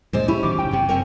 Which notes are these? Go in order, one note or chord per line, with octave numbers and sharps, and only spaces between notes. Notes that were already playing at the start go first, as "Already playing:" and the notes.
D2 A#2 G#3 C5 D5
C#4 E4 G4
A1 D#3 F#3 D6
F1 C#2 G5
F#1 F#2 C3
C4 C#4 A#4